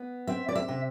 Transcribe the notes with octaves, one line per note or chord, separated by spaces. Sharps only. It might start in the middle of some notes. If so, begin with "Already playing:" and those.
Already playing: B3
C4 E5
D5
E5
C3